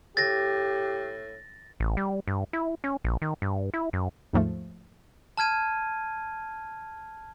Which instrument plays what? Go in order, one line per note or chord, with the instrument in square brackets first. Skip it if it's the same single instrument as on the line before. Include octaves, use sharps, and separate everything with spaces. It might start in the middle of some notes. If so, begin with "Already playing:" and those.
[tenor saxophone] A2 [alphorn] G4 [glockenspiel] A6 A#6
[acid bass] A1
G3
G2
E4
C#4
A#1
D#3
G2
E4
F#2
[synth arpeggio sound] D#2 G#2 F3 A3
[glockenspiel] A5 F6 G#6 D#7